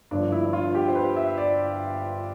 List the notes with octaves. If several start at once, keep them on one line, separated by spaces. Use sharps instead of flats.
G1 G2 D3 F3 D4
E4
F4
G4
C5
B4
E5
D5